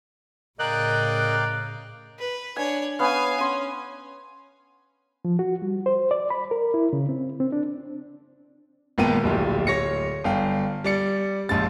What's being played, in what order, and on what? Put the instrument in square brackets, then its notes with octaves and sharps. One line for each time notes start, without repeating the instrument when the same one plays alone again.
[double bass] A2 C#3 [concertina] A#4 D#5 [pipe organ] D5 F5 G5 [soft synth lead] F#6
[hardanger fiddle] B4
[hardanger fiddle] D4 C#5 [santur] G#5
[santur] B3 C#4 [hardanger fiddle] F5 G#5
[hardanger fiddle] C#4 [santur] C6
[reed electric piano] F3
F#4
G3
C5
D5
B5
A#4
E4
C#3
C4
C4
D4
[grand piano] G#1 A#2 A#3 B3 G5 D#7
D1 A#1 G4
D1 C#5 A#6 C#7
G1 F5 G5
G3 D5 C#7
A#1 G#2 A5 A6